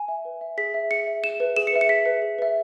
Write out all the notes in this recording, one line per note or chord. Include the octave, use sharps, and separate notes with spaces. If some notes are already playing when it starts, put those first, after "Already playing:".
Already playing: G#5
E5
B4
E5
G#4 B6
E5
G#4 C#7
E5
G#4 E7
B4 E5
G#4 E7
C#7
B4 E5
C#7
G#4 B6
B4 E5
G#4
B4 E5